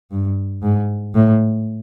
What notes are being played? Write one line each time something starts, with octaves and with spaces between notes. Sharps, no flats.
G2
G#2
A2